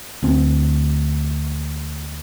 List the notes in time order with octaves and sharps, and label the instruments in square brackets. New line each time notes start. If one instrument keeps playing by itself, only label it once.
[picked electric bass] D2 C4